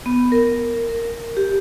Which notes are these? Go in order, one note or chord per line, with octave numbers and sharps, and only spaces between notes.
B3
A#4
A#4
G4